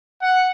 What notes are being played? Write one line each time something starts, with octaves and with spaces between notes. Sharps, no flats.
F#5